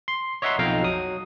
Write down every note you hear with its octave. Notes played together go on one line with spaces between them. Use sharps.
C6
C#5 D#5 E5 F#5 A#5 C6
B1 F2 D#4 F5 G5 A#5
F#3 D#6